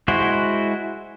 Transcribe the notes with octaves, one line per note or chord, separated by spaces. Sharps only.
G#3 E4 F#4 C5